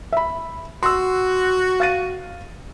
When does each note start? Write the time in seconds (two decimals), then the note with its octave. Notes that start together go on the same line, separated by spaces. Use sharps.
0.12 E5 B5
0.83 F#4 C6 E6
1.80 F5 A6 D#7